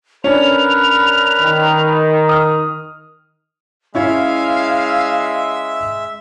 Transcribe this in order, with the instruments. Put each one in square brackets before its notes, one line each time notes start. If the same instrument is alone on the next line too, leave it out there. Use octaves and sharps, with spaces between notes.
[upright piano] C#4 D4 [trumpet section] A#4 B4 [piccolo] F7
[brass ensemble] D#3
[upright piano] D#6 F6
[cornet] G#3 [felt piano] C#4 E4 C#5 [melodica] E5 [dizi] F5